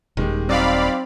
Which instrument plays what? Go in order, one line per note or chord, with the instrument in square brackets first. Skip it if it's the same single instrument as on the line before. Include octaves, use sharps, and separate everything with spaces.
[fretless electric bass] D#1 [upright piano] D#3 G#3 G4
[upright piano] F#3 D#4 [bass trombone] C4 [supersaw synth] D5 F5 B5